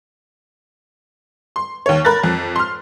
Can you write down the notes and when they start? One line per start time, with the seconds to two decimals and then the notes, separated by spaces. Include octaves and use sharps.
1.56 C6
1.86 D#2 C#5
2.05 A#4 B5 F#6 A6
2.24 F2
2.56 C6 F6